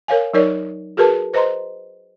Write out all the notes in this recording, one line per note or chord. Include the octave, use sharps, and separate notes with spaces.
A#4 C#5 F5 G#5
F#3 D#4 A#4 C#5 D5
F#4 G#4 A#4 B4 A5
B4 C5 D#5 A#5 C6